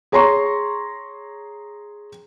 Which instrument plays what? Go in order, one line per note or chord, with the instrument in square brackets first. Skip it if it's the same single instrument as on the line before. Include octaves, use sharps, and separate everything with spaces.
[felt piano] G#4 C#5 A#5 C6 C#6